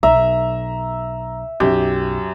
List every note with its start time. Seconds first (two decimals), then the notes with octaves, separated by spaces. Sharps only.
0.03 B1 E5 A#5
1.60 B1 F#2 G4